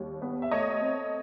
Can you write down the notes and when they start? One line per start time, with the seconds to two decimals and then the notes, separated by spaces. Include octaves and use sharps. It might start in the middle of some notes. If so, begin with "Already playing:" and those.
Already playing: D#2 G3
0.22 B3
0.42 E5
0.51 A3 C#5 D#5
0.81 C4